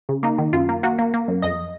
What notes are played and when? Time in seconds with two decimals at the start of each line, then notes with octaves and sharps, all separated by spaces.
0.09 C#3
0.23 A#3 D#4
0.38 D#3
0.53 F#2 F4
0.69 A#3
0.83 A#3 F#4
0.99 A#3
1.14 A#3
1.28 F#2
1.42 F2 D#5